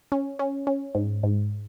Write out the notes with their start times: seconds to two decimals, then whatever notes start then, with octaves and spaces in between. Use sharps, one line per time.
0.12 C#4
0.39 C#4
0.67 C#4
0.95 G#2
1.23 G#2